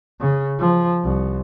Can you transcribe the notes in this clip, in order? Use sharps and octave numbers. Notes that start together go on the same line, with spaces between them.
C#3
F3
C2